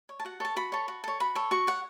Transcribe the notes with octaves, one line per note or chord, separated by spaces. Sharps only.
C#5
A5
F#4 F#5
A4 C#5 A5
F#4 B5
A4 C#5
F#4
A4 C#5
F#4 B5
A4 C#5
F#4 C#6
C#5 F#5